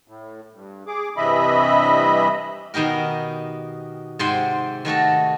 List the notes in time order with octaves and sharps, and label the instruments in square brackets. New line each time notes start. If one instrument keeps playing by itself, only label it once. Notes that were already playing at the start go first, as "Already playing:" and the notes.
[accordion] A2
G2
G#4 D6
G2 C3 E3 D#5 E5 B5
[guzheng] B2 D#3 D#4 G4 A#4
G#2 C3 C5 F#5 G5 C6
D#3 A3 F#4 A4